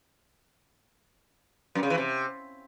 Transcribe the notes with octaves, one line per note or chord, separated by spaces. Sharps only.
F#2
C#3
E3
C3